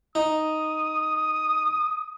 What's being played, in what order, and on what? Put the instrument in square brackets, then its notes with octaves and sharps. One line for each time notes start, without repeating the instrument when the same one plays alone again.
[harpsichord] D#4 [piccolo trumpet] D#6